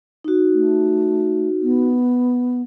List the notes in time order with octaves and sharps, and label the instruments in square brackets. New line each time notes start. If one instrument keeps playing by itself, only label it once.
[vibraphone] D#4 F#4
[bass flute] A3
B3